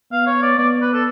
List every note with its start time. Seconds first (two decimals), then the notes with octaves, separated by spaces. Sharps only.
0.12 B3 F5
0.27 C#5
0.42 D5
0.58 B3 D5
0.82 B4
0.94 A4